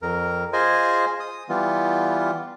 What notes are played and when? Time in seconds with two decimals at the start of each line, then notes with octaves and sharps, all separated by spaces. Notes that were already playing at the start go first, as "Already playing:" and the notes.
0.02 F2 A#4
0.53 F4 G#4 C5 D#5 G#5
1.20 D#6
1.49 E3 G3 B3 F4